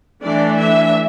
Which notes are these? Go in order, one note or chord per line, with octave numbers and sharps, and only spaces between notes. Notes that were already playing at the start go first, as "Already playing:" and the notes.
E3 A3 D4 D5
E5